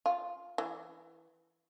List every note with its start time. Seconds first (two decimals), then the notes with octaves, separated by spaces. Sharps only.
0.06 F4
0.58 E3